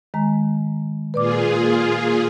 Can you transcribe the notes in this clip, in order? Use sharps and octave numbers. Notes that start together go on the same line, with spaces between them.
D#3 G#3 A#5
A#2 F4 G#4 B4 D5 D6